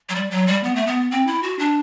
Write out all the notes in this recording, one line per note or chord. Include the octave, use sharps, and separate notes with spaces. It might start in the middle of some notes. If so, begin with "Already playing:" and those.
F#3
G3
F#3
G3
B3
A3
B3
C4
E4
F#4
D4